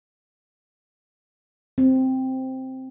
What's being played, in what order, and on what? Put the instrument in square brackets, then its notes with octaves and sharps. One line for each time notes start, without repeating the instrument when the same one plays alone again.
[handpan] C4